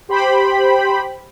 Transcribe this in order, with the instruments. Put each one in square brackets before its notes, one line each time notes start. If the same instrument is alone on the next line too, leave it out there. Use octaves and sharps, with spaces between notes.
[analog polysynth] G4 C5 G5 B5